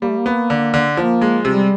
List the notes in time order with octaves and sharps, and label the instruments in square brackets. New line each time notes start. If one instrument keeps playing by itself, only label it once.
[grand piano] G3 [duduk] A#3
[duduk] A3
A#3
[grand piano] B3
D3
D3
[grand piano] F3 [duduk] A#3
[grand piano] G#3
[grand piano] C3 [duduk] G3